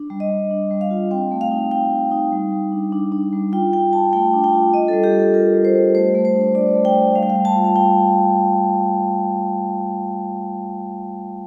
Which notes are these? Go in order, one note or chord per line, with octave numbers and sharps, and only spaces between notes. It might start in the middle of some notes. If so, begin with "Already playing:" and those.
Already playing: D4
G3
D#5
G3
D4
G3
F5
F4
C4 G5
A3
F5
D#4
A3 G5
C4
D#4
G3
G3
D4
D4
D4
G3
F4 G5
F4 G5
F4 A5
A3 G5
D4
G5
F4
D4 D#5
A4
G3
G4
G3
A4
F4 A#4
G3
C5
G3
A3 C5
A3
C5
D4
D4 D5
A3
G5
A3
G3 F5
G5
F5
G3
A5
F4
F5
G3 G5